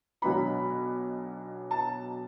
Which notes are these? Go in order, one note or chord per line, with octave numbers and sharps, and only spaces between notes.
B1 B2 F#3 B3 D4 B5
A5